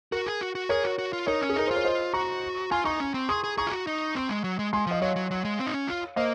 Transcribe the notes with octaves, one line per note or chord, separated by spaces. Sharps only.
F#4 A#4
G#4
F#4
F#4
G#4 A#4 C#5
F#4
F#4
F4
D#4 A#4 C#5
C#4
G#4
D#4 A#4
F4 C5
C#5
C5 D#5
F#4 A#5 C#6
F4 G#5 C6
D#4 A#5 C#6
C#4
C4
G#4 C6 D#6
G#4
G#4 A#5 C#6
F4
F#4
D#4
C4
G#3
F#3
G#3
G#3 G#5 C6
F3 D#5
F#3 C#5 F5
F#3
F#3
G#3
C4
D#4
C#4
F4
A#3 C5 D#5